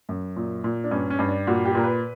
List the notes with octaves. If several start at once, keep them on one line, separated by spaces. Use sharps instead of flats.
F#2
A#2
A#2
D4
G2 C#4
C#4
G2
D4
A#2 F#4
G4
A#2 A#4
B4